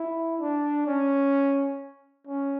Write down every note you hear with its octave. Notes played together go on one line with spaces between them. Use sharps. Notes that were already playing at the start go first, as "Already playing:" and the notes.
Already playing: E4
D4
C#4
C#4